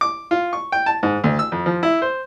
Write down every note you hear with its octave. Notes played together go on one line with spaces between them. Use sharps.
D6
F4
C#6
G5
A5
G#2
D2
E6
F2
F3
E4
C5